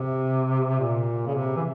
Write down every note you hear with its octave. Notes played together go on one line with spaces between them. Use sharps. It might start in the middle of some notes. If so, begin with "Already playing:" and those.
Already playing: C3
A#2
C#3
C3
E3